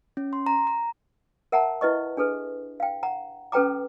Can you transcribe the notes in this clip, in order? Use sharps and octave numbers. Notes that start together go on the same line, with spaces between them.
C#4
C6
A#5
A#5
A#4 E5 F#5 A5 A#5
E4 B4 D#5 C#6
D4 G#4 A4 B4
F5 G5
F#5 A#5
C#4 A4 B4 G5 A#5 D6